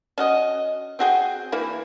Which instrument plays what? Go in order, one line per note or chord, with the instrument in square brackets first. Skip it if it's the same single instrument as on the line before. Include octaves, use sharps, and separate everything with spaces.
[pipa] C#4 F#4 D#5
C4 F#4 G#4 G5
E3 A#3 E4